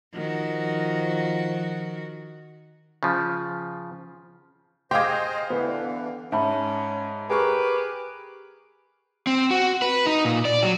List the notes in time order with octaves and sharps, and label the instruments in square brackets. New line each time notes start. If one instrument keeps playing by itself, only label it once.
[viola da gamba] D#3 F#4 [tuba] F3
[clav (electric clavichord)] C#3 F3
[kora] G4 G#4 [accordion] C5 D#5 [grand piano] F5 G5 [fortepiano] C6 D6
[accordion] D3 E3 [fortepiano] B3
[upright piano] G#2 [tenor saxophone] C#4 [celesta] E5 A5 B5
[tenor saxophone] G4 [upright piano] G#4 A#4 C#6 [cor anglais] B4
[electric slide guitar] C4
F#4
B4
D#4
A#2
D5
F#3